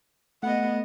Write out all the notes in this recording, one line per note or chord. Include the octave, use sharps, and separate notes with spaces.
A3 B3 D#5 F#5